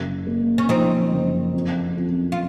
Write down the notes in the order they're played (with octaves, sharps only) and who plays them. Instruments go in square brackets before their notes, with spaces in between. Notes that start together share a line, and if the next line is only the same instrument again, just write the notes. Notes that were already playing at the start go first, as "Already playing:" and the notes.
Already playing: [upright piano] F#1
A#3
[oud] C#4
[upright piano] F3 [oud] C4 D#4
[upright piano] F#1
F2
F2
[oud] F4